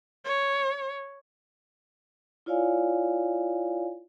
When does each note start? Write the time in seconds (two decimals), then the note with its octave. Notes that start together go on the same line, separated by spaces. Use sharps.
0.25 C#5
2.46 E4 F4 C#5 D5 F5 G#5